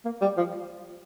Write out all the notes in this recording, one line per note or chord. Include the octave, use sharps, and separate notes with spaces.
A#3
G3
F3